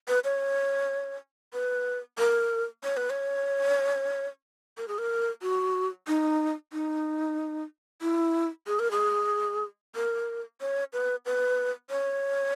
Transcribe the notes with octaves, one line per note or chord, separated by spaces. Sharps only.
B4
C#5
B4
A#4
C#5
B4
C#5
A#4
G#4
A#4
F#4
D#4
D#4
E4
G#4
A#4
G#4
A#4
C#5
B4
B4
C#5